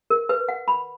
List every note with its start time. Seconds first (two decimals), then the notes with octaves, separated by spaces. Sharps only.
0.10 A#4
0.29 B4
0.49 F#5
0.68 B5